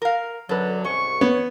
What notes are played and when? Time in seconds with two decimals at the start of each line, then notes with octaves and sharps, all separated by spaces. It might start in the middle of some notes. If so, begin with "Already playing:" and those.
0.02 A#4 F5
0.49 F#2 D3 F#3 A4 B4
0.84 C2 G#2 C#4 C#6
1.21 B3 C#5